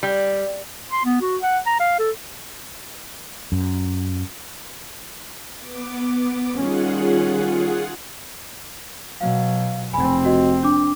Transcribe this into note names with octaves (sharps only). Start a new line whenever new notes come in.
G3
C6
B3
F#4
F#5
A#5
F5
A4
F#2
B3 D6
D#3 G3 C#4 F4 G#4 F#5
B2 F#3 F5
F1 C4 G#5 B5
F#4 D#5
D4 D6